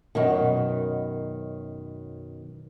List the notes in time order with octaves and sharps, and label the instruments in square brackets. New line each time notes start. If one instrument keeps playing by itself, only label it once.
[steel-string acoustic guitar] F#2 B2 D#3